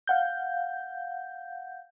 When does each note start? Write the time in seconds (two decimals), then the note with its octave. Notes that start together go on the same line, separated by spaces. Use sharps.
0.07 F5 F#5 G6